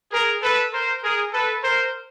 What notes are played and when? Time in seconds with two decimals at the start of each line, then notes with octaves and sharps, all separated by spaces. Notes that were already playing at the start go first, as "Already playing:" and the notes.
0.12 G#4 A#4
0.42 A4 B4
0.73 A#4 C5
1.02 G#4 A#4
1.32 A4 B4
1.63 A#4 C5